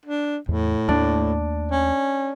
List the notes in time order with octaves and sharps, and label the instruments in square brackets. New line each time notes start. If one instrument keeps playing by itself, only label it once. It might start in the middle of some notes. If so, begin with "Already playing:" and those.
[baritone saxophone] D4
[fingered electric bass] E2 [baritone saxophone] A2
[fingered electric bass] D#2 A3 A#3 [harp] D4
[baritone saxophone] C#4